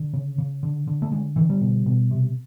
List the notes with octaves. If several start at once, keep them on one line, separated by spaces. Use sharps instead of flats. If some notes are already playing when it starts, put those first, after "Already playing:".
Already playing: D3
C#3
C#3
D3
D3
A3
D3 G#3
D3 E3
G3
B2
B2
C3